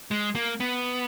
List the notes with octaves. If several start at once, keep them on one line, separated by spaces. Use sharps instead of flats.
G#3
A#3
B3